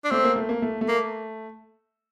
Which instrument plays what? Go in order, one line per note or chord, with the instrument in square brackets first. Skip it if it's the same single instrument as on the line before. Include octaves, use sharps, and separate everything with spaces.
[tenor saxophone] D4
[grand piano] A3 [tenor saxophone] C4
[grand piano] A#3
A3
A#3
A3
A3
[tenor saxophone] A#3